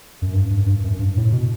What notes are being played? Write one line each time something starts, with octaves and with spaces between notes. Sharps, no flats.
F#2
G2
G2
G2
F#2
G2
A2
B2